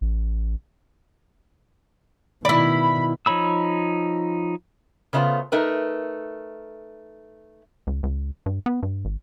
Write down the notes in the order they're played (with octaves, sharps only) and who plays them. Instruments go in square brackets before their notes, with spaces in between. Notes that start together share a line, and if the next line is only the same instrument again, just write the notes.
[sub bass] A1
[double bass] B2 D#3 [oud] E4 D5 [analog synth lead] B5
[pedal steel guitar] F3 D#4 C#5 B5 E6
[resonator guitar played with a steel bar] C#3 A3 B3 F4 C5
A3 D#4 A#4 B4
[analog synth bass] C#2
C#2
G2
B3
G2
G#1